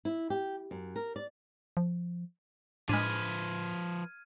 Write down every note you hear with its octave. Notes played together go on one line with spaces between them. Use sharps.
E4
G4
F#2
A#4
D5
F3
A2 F3 G#3 D4 B4 F6 G#6 D#7